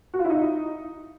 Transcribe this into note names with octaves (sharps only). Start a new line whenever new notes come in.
F#4
F4
E4
D#4